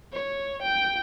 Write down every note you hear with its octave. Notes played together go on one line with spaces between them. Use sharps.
C#5
G5